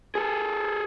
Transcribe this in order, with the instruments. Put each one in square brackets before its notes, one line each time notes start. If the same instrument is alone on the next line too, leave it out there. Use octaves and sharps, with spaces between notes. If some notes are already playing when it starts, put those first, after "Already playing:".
[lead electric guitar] G#4 A4